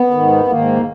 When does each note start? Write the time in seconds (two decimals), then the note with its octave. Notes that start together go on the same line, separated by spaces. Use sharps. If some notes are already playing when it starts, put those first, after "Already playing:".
Already playing: B3
0.11 G#2 D#3
0.48 G#2 D#3 A#3